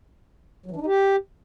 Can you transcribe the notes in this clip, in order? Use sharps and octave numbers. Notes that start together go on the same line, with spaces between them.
F#3
E3
D4
D#4
G4